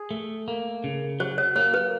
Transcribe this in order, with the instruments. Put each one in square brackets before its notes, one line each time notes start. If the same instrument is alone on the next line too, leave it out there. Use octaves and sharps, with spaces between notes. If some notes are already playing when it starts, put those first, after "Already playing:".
Already playing: [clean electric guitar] G#4
A3
A#3
C#3
[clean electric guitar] F#3 [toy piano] C5
[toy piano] C#5
[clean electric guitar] A#3 [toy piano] C#5
[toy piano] B4